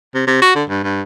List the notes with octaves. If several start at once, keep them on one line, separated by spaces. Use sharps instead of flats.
C3
C3
F#4
D3
G2
G2